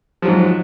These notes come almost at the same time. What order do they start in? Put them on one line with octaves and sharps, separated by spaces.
F3 F#3 G#2